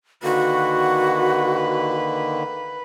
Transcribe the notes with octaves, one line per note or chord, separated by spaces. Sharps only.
D3 D#3 A#3 F#4 B4